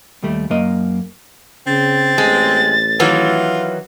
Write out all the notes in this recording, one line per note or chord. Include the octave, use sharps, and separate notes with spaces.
D#2 G3 A3
F#2 A#3 D#5
C#3 C4 A6
A1 G#3
D#3 E3 F#3 F4